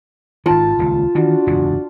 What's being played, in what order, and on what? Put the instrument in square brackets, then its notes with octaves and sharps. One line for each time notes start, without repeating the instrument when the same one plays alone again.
[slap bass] G#1 D#3 [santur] F4 A5
[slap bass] D#1 C#2
[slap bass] D#3 E3 [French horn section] D4 F#4
[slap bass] F#1 E2 G#2